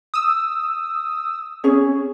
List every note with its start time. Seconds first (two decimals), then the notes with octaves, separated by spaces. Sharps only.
0.14 D#6 E6
1.64 C#4 G#4 C#5